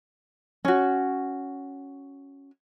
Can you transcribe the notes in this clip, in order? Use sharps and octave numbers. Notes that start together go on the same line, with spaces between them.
C#4 F#4